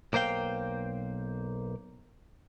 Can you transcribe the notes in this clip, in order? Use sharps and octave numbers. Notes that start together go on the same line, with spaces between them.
B1 A#3 C5 F5 G5